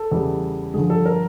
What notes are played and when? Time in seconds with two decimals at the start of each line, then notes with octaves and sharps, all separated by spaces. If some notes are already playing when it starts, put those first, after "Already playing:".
Already playing: A4
0.11 E2 C#3 E3 G3
0.74 G2 D3 F3 G#4
0.90 A4
1.06 A#4